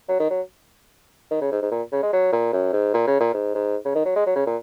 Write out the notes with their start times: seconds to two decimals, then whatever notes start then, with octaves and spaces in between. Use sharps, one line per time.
0.08 F#3
0.20 D#3
0.30 F#3
1.30 D#3
1.41 C#3
1.51 G#2
1.62 G#2
1.72 A#2
1.92 C#3
2.02 G#3
2.13 F#3
2.32 A#2
2.53 F#2
2.73 G#2
2.94 A#2
3.07 C#3
3.20 A#2
3.34 G#2
3.55 G#2
3.85 C#3
3.95 D#3
4.05 F#3
4.15 G#3
4.26 F#3
4.35 C#3
4.46 A#2